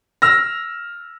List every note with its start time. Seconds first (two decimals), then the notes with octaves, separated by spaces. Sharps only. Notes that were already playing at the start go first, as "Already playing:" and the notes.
0.22 E6 F6 A#6